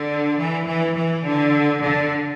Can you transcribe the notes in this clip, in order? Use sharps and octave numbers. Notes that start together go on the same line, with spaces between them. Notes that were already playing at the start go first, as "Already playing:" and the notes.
Already playing: D3
E3
E3
E3
D3
D3